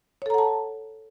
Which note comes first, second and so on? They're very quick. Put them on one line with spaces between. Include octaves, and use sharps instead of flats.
C#5 A4 A#5 F#5 A5